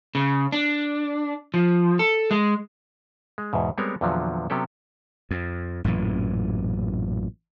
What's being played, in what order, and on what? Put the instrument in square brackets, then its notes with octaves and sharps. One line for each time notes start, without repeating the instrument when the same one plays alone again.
[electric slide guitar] C#3
D4
F3
A4
G#3
[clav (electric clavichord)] G#3
E2 G#2 B2
G3 G#3 B3 C4 A#4 C#5
E2 A#2 D3 F3 F#3
C3 F#3 B3 C#4 G4 A4
[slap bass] F2
A1 F#2 A#2 E3